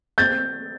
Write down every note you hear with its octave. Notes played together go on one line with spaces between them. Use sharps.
C4 G6 A6